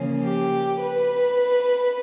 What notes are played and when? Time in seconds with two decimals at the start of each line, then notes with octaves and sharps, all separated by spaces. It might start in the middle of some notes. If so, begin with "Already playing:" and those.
Already playing: C#3 F3 A#3 C#4
0.25 G4
0.80 B4